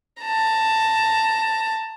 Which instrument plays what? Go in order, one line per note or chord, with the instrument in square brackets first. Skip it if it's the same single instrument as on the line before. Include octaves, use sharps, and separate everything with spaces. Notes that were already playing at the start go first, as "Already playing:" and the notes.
[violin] A5 A#5